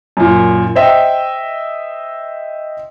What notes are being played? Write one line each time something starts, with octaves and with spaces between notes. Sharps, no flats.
F#2 A#2
C5 D#5 E5 G5